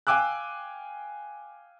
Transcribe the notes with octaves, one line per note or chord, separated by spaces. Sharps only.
F5 G5 G#5 D6 E6 F#6